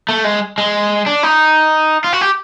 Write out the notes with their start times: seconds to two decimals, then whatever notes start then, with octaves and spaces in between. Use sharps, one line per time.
0.09 A3
0.24 G#3
0.58 G#3
1.06 D4
1.23 D#4
2.04 F4
2.13 F#4
2.21 G4